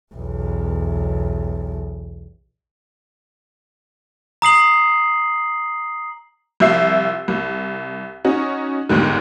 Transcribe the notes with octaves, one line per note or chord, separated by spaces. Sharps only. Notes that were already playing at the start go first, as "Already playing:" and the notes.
B1 E2
A#5 D#6 C7 F#7
C2 F3 E5 E6 C7
C2
C#4 D#4 F#4
G1 D#2 G#2 D3